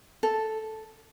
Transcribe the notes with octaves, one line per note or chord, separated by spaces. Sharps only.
A4